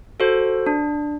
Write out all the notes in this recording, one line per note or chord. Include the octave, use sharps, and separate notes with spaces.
F#4 A4 C5
D4